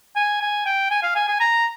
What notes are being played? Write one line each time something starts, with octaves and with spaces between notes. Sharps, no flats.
G#5
G#5
G5
G#5
F5
G#5
G#5
A#5